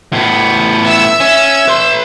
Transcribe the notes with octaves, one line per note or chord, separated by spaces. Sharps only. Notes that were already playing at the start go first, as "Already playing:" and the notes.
A2 B3
E5 E6
C#4
B4 C6